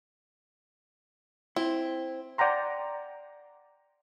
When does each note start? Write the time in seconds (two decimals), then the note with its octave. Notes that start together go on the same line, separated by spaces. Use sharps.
1.56 C4 E4
2.38 D5 F#5 G5 A#5 C6